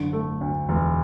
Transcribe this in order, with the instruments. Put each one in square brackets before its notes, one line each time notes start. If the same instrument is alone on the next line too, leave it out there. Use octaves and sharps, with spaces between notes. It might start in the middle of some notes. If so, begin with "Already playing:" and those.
Already playing: [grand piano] F#1 D3
A3
D2
E1